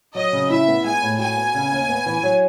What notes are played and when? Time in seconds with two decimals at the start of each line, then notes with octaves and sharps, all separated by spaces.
0.15 F#3 D#5
0.32 C#3
0.50 E4 E5
0.68 B3
0.84 G#3 G#5
1.02 A2
1.19 F#4 G#5
1.36 B3
1.54 C#3
1.71 D#2
1.89 B3
2.06 E3
2.23 F#3